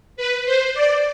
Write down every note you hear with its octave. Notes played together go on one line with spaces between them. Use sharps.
B4
C5
D5